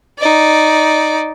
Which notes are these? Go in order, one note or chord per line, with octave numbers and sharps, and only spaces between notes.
D#4 D5